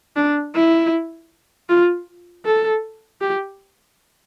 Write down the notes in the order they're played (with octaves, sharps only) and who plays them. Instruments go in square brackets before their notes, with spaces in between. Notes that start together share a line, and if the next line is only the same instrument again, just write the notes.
[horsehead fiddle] D4
E4
F4
A4
G4